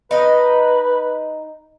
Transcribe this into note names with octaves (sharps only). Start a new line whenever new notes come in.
D#4 B4 D#5